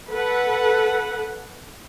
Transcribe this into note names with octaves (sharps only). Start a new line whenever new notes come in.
A4 B4 F#5